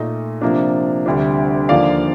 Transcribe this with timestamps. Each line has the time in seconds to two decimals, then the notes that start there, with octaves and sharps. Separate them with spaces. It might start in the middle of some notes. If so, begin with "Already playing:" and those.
Already playing: A#2 A3 D#4 D#5
0.41 C3 F3 A#3 D4
1.06 D2 C3 G3 D4
1.69 D#2 D3 F3 A#3 D5 F5